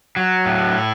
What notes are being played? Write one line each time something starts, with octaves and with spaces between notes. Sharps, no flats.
F#3
A2
E4